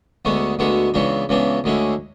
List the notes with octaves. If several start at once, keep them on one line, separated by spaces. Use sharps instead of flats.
D2 D3 G#3 B3 F#4
D2 D3 G#3 B3 F#4
C#2 C#3 E3 B3 D4
C#2 C#3 E3 B3 D4
D2 D3 G#3 C#4 E4